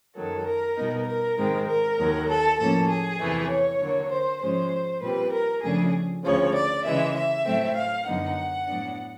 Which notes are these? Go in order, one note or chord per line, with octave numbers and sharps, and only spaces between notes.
F#2 D#3 F#3 A4
A#4
B2 G3 B3 D#4
A#4
G#2 D#3 G#3 C4
A#4
D#2 D#3 F#3
A4
A2 F3 A#3 C#4 A4
G#4
E2 C3 E3 A3
C#5
D3 F#3 A#3
C5
G#2 F3 G#3 C#4 C5
A#2 G3 C4 B4
A#4
F2 C#3 F3 A3 D4 G#4
D2 C#3 F3 C#5
D5
C#3 E3 G#3 E5
E5
A2 F#3 A3 C4
F5
F#2 D3 F#3 B3 D#4 F#5
A2 F#3 B3 D4